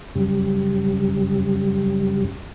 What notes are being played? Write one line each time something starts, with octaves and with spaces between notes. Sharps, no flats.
F#2 C#3 G3